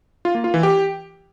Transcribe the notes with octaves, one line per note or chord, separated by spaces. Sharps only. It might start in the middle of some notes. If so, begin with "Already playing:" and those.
F4
A#3
F4
E3
G4